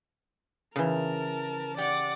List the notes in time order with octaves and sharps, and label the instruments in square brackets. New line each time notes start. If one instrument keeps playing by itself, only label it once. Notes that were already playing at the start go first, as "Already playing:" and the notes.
[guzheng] C#3 E3 [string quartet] A#4 A5
[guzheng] G4 [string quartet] D5 F#5 D6